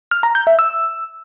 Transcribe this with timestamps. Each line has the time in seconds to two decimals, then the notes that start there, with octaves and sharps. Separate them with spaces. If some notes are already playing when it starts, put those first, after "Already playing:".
0.11 F6
0.23 A#5
0.35 G6
0.47 E5
0.59 E6